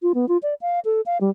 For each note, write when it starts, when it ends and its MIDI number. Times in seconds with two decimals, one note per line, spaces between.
0.02 0.12 65
0.15 0.28 59
0.28 0.37 65
0.43 0.54 74
0.61 0.80 77
0.85 1.01 69
1.06 1.18 77
1.21 1.30 55